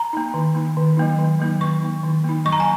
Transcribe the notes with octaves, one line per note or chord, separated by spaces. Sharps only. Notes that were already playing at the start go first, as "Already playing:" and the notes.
Already playing: A#5
A#3 D#4
D#3
A#3 D#4
D#3
F#3 A#3 D#4
D#3
F#3 A#3 D#4
D#3 C#6
A#3 D#4
D#3
A#3 D#4
F#3 C#6
A#5
G#5